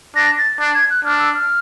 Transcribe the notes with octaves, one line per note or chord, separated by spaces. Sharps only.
D4 A#6
A6
D4
G#6
F#6
D4 F6
E6
F6